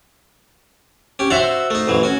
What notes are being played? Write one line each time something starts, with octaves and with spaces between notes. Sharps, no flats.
C#4 G4
F#4 C5 E5 F#5 A5 A#5
A3 D#4
A1 E3 F#3
C#4 F#4